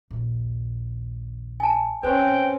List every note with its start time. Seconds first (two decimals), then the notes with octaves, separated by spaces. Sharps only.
0.11 A#1 D#2
1.60 G#5 A5
2.03 F2 C4 C#4 B4 C5 G5